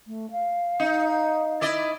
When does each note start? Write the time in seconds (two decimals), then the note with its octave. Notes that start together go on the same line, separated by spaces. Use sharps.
0.07 A3
0.31 F5
0.80 D#4
1.61 E4 D5 D#5